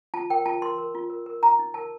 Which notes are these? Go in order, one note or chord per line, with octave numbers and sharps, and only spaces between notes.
F4 A5
A#4 G5
F4 A5
A#4 C6
A#4
F4
A#4
A#4
D#4 A#5
D#4
A#4 A5